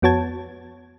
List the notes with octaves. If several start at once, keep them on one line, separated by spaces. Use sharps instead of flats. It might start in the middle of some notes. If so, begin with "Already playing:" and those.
F2 B3 F#4 C#5 A5 G#6